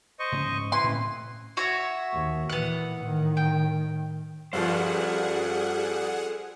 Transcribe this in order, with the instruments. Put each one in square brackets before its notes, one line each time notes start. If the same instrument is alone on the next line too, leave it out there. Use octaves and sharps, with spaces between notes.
[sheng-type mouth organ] C5 D#5 C#6
[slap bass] G#2 C#3
[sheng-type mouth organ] E4 B4 [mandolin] C6
[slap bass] A2 C4 C#4
[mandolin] F#4 C#5 E5
[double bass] D#2
[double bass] A#2 E3 [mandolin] B3 F#5
[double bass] A2 D#3
[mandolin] G5
[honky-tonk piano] G2 F3 [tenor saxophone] G3 [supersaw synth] G#4 F#5 [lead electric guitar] A4 C5